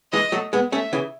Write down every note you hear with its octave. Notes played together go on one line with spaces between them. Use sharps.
E3 G#3 D#5
F#3 A3
G#3 B3
A3 C#4 E5
C#3 E3